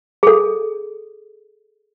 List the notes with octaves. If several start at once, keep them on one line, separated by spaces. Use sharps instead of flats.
G#4 A4